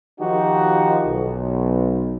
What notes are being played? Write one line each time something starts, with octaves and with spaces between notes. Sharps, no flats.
D#3 F3 D#4 F#4 G4
B1